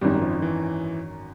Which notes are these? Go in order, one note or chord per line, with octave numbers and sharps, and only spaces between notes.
G#1 F#2 D#3 G3
F3
E3